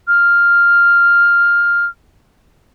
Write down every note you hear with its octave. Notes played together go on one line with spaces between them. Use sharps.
F6